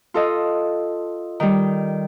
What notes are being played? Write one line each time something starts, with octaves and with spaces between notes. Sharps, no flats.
F4 A4 D#5
D#3 G3